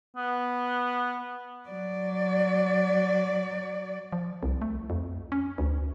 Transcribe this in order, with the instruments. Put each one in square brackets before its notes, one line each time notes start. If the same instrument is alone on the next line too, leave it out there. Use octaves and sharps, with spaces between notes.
[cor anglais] B3
[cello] F#3 D5
[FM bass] F3
C2
A3
F2
C#4
D2